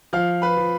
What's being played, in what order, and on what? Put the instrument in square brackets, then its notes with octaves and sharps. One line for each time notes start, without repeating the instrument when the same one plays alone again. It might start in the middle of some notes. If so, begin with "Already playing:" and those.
[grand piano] F3 F5 F6
B4 B5
F3